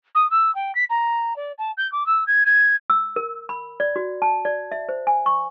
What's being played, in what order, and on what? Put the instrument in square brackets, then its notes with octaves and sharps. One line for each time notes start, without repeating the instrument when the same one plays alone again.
[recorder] D#6
E6
G5
B6
A#5
D5
A5
G6
D6
E6
G#6
G#6
[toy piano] E6
A#4
B5
D5
F#4
A5
D5
E5
C5
G#5
C#6